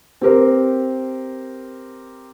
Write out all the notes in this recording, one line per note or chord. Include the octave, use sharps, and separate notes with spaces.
C4 G4 A#4 C5